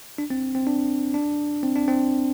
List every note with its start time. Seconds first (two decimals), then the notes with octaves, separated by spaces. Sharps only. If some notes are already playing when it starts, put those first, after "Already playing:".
0.18 D4
0.30 C4
0.55 C4
0.67 D4
1.14 D4
1.63 C4
1.76 D4
1.88 C4